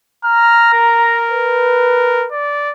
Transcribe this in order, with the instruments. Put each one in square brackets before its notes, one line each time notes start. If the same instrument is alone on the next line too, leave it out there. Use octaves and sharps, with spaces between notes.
[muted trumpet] A#5 [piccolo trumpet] F6
[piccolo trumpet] A#4
[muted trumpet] B4
[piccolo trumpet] D5